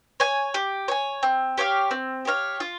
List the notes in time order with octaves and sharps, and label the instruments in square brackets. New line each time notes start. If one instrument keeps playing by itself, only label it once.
[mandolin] C#5 G#5
G4
C#5 G#5
C4
G4 C#5 F5
C4
G4 C#5 F5
F4